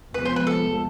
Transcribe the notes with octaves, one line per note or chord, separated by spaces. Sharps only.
E2 C3 F3 G#3 B3 B4
C5
B4
A4